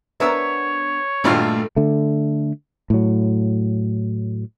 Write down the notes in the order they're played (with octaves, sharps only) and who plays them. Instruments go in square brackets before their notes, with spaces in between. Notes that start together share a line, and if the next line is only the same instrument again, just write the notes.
[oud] B3 D4 A#4 [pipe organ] C#5 [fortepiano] E5 E6
[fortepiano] G#1 G2 F4 [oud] A#2 A3 D4
[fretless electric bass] D3 A3
A2 F#3